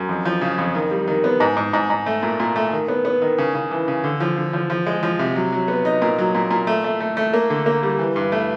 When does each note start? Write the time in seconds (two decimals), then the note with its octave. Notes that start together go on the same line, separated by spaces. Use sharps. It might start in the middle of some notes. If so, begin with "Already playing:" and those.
Already playing: F#2
0.09 F2
0.25 F3
0.41 C#3
0.58 F2
0.75 D#3
0.91 G3
1.08 D#3
1.24 B3
1.40 G#2
1.57 G#2
1.73 G#2
1.90 G#2
2.06 A3
2.23 A#2
2.40 A#2
2.56 A3
2.72 D#3
2.88 B3
3.05 B3
3.22 D#3
3.38 C#3
3.55 C#3
3.71 E3
3.88 C#3
4.04 D3
4.20 F3
4.37 D3
4.53 F3
4.70 F3
4.87 G#3
5.03 F3
5.19 C3
5.35 F#3
5.52 F#3
5.68 B3
5.85 D#4
6.02 A#2
6.18 F#3
6.35 A#2
6.51 A#2
6.67 A3
6.84 A3
7.00 A3
7.17 A3
7.33 A#3
7.50 D3
7.66 A#3
7.83 G3
7.99 E3
8.16 G2
8.32 A3